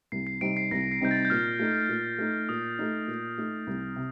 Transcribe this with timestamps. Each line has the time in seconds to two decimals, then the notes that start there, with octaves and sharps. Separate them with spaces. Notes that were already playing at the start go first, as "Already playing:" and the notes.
0.12 C2 C7
0.27 C7
0.41 C3 G3 C4 D#4 D7
0.57 C7
0.71 C2 A#6
0.92 C7
1.01 C3 G3 C4 D#4 G6
1.11 A6
1.25 G6
1.30 A#2 F6
1.59 A3 D#4
1.89 A#2
2.18 A3 D#4
2.49 A#2 D#6
2.79 A3 D#4
3.08 A#2
3.38 A3 D#4
3.67 C2
3.96 C3